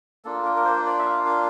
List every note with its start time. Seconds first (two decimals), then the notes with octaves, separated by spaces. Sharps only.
0.25 A#3 D4 F4 A4
0.45 A#4
0.57 A#4
0.65 C5
0.86 D5
0.99 E5
1.05 F5
1.26 F5